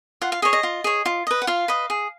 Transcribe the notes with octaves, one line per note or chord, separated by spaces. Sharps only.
F4 F#5
F5
G#4 C#5 D#5
D#5
F4
G#4 C#5
F4
B4 D#5
F#5
F4 F5
B4 D#5
G#4